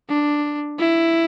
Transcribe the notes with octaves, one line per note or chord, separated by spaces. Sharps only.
D4
E4